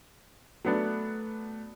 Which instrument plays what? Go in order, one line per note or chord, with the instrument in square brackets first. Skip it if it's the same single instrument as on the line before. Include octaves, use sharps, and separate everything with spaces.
[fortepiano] F#3 B3 D4 [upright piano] A3